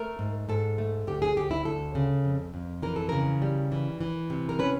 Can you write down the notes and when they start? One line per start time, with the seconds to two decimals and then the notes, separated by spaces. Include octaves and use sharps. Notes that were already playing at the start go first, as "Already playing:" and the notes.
Already playing: A3 A#4
0.19 G#2
0.49 G#2 A4
0.78 A3
1.07 D2 G4
1.22 G#4
1.37 D2 G4
1.51 E4
1.65 D2 A4
1.95 C#3
2.25 F2
2.54 F2
2.83 E3 A#4
2.96 A4
3.09 C#3 A#4
3.42 G3
3.72 E3
4.01 E3
4.30 C3
4.49 A#4
4.59 C#4 B4